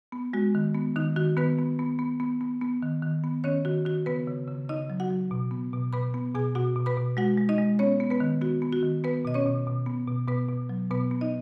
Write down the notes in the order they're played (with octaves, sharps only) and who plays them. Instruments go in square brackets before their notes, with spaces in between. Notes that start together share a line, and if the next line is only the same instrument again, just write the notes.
[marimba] B3
G#3 F#4
D#3
B3
D#3 D#4
D#3 F#4
D#3 B3 B4
B3
B3
B3
B3
B3
B3
D#3
D#3
B3
D#3 C#4 C#5
D#3 F#4
D#3 F#4
C#3 B3 B4
C#3
C#3
C#3 D#4 D#5
F#3
F#4 F#5
F#3
B2
B3
B2
B2 B4 B5
B3
B2 G#4 G#5
B2 F#4 F#5
B2
B4 B5
B2
G#3 F#4 F#5
G#3
D#4 D#5
G#3
B3 C#4 C#5
B3
B3 B4
D#3
B3 F#4
B3
F#4
D#3
B3 B4
B2 D#5
C#4 C#5
B2
B2
B3
B2
B2 B3 B4
B2
F#3
B2 B3 B4
B3
D#4 D#5